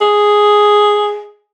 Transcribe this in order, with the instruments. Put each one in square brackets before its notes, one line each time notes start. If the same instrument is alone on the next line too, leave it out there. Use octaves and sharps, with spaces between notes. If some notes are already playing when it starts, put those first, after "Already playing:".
[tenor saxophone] G#4